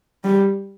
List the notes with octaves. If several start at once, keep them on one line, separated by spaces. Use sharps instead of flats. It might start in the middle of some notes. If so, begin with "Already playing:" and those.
G3